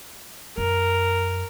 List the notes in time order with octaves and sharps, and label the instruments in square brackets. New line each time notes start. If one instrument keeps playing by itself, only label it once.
[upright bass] F#2 [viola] A#4